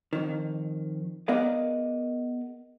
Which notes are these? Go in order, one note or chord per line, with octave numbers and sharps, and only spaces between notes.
F2 D#3
B3 G#4 A#4 D5 D#5 F5